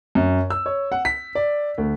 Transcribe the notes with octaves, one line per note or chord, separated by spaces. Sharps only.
F#2
E6
C#5
F#5
B6
D5
D2